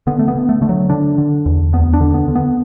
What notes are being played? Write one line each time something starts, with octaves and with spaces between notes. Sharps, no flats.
D3 B3
A3
B3
D3
A3
D3 A3
F#3
D3 D4
D3
E2
D2 B3
D4
D3
B3
D3
B3